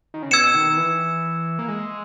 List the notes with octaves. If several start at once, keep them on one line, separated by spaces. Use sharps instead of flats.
D#3
C#3
B2 E6 G#6 C#7 E7
D#3
D#3
E3
A#3
G#3